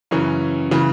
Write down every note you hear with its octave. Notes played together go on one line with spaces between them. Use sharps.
F#2 C#3 E3 C#4
C#3 E3